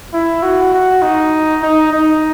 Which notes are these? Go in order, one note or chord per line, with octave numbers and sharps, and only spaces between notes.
E4
F#4
F#4
D#4
D#4
D#4